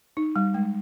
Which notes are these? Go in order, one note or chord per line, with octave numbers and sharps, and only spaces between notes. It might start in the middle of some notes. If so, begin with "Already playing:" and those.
D#4
G3
G#3